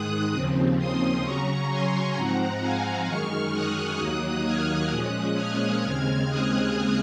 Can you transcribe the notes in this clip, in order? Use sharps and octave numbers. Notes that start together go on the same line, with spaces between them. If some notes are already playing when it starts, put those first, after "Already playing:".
Already playing: G#2 D#3 G#3 D#6 F#6
D#2 C#3 F3 C4
C6 D#6
C#3 F#3 C#4 A#5 C#6
G#5 C6
G#2 F3 C4 F#5 A#5
F5 G#5
F#2 D#3 G#3 C#6 F6
D#6 F#6
D#2 D#3 F#3 A#3
F6 G#6
A#2 F3 G#3 C#4 D#6 F#6
F6 G#6
D#2 C#3 G#3 C4 F6 G#6
D#6 F#6